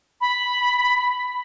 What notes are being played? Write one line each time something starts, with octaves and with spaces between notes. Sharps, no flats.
B5